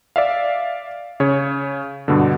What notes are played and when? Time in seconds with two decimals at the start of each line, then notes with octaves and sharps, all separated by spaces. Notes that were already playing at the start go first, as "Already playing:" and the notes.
0.16 D5 E5 F5
1.20 C#3 C#5
2.08 G2 B2 D3